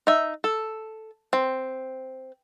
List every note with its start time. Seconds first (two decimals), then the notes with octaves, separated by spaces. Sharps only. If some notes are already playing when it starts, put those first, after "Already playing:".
0.07 D#4 E5
0.44 A4
1.33 C4